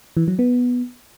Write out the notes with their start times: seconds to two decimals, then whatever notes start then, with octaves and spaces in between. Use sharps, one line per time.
0.17 E3
0.28 F#3
0.39 B3